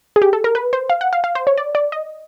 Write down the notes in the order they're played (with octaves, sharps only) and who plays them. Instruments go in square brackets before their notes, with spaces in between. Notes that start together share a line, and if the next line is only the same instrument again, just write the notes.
[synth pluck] G#4
G4
A4
A#4
B4
C5
F5
F#5
F5
F5
C5
C#5
D5
D5
D#5